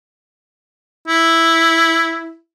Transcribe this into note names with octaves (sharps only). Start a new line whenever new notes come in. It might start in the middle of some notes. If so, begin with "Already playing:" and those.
E4